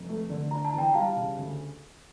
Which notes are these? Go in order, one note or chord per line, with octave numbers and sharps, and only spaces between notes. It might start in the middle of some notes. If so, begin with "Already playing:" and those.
Already playing: F1
A3
D3
D4 A#5
A5
E2
G5 A#5
G3 F5 A5
C#3
D2